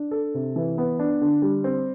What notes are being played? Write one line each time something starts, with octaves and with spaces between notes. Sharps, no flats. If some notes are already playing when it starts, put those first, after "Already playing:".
Already playing: D4
A4
C3
E3
B3
D4
D3
G3
C4